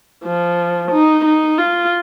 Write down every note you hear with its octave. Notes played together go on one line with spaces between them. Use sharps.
F3
D#4
D#4
F4